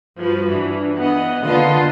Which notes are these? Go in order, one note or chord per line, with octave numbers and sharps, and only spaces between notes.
G2 F3 F#4 B4
E3 D4
E3 B3 D#5 F#5
D3 A#3 F4 B4 D#5 F#5 A5 C6